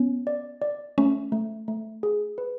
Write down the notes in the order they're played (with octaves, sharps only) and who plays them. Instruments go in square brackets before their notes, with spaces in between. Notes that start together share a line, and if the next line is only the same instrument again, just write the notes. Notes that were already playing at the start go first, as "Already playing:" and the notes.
Already playing: [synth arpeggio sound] B3 [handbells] C#4
[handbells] D5
D5
[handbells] A3 [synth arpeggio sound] C#4
[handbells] A3
A3
G#4
B4